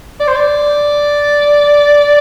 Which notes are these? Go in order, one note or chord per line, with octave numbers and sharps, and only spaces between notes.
D5
C5
D5